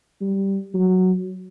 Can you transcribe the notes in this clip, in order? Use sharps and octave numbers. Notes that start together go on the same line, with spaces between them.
G3
F#3